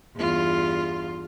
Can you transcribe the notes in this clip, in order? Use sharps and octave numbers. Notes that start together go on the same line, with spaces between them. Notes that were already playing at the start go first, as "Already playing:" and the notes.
E2 G2 F4